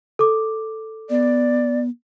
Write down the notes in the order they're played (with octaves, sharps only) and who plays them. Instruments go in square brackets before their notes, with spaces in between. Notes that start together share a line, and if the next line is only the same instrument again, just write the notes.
[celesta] A4 D6
[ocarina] B3 [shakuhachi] D5